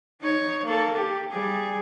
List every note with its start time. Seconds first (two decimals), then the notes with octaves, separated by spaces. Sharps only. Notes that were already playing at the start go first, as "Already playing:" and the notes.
0.21 D#4 C#5
0.64 A#3 A4
0.95 G4
1.30 G3 G#4